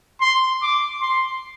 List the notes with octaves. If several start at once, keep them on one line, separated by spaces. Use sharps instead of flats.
C6
D6
C6